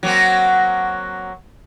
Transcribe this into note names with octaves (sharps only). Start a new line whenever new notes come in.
F#3 A#3 C4